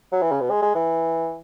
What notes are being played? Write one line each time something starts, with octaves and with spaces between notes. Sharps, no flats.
F#3
E3
C#3
B2
G#3
G#3
E3